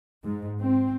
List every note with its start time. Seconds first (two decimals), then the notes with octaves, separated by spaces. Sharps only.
0.24 G#2
0.61 C4